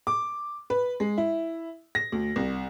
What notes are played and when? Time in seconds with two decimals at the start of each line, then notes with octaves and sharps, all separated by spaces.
0.07 D6
0.70 B4
1.00 G#3
1.18 E4
1.95 A#6
2.12 D2
2.36 C2